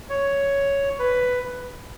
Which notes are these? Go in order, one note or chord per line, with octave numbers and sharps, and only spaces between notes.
C#5
B4